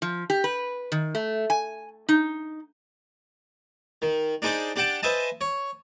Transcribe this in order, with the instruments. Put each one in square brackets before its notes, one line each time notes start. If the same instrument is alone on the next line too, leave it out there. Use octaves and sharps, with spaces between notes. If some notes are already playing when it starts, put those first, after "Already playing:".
[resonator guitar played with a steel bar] F3
G4
B4
D#3
A3
G#5
D#4
[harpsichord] D#3
D4 D#4 G#4 C5 D5
D4 G4 F#5 G5 A5
B4 C5 D#5 E5 G#5 A5
C#5